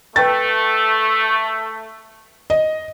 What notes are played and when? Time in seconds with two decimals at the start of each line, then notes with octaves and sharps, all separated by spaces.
0.16 A3 B4 G5 A6
2.50 D#5